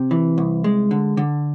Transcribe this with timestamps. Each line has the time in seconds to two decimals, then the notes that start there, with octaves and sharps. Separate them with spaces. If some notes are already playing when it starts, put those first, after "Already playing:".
Already playing: C3
0.11 E3
0.38 C2
0.64 G#3
0.91 D3
1.17 D3